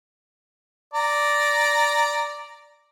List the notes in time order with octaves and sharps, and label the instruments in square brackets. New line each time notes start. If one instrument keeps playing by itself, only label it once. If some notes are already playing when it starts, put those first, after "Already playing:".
[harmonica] D5 A#5